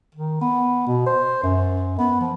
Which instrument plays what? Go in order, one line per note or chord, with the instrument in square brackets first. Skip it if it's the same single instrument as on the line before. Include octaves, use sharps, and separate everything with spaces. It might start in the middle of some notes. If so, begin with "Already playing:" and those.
[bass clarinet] D#3
B3
B2
C5
F#2
B3
F3